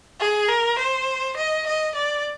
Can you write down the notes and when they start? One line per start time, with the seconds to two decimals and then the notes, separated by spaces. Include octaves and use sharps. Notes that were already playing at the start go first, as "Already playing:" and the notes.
0.20 G#4
0.48 A#4
0.78 C5
1.37 D#5
1.67 D#5
1.95 D5